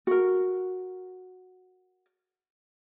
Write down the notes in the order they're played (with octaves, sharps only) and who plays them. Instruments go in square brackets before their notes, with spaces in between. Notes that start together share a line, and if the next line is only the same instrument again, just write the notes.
[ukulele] F#4 A#4